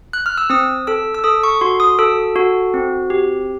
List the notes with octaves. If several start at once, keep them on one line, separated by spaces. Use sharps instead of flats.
F#6
F6
E6
C4 D#6
A4 E6
E6
A4 D#6
C#6
F#4 C6
D#6
A4 E6
F#4
C4
G4